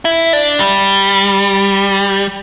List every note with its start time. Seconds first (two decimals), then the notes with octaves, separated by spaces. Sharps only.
0.05 E4
0.33 D4
0.60 G3